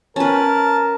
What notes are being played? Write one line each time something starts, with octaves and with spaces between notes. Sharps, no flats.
C#4 A#4 B4 A5